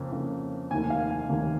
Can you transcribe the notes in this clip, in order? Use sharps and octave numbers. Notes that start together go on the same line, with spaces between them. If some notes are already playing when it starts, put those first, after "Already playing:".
Already playing: F2 C#3 A#3
F2 C#3 A#3
F1 D#2 D#3 A#3 G#5
F5
G#5
F1 D#2 D#3 A#3